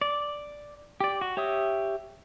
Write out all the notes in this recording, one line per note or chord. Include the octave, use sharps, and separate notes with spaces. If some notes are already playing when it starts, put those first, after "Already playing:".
D5
G4 D5
F#4
G4 C#5 E5 D#6